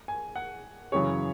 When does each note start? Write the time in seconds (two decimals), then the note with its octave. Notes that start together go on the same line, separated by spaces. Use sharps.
0.08 G#5
0.36 F#5
0.92 F#2 C#3 E3 C#4 G#4 C#5